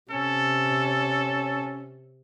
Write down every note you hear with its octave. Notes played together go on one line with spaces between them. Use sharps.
C3 C#4 A4